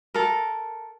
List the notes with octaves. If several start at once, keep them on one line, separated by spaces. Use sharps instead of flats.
A4 A#4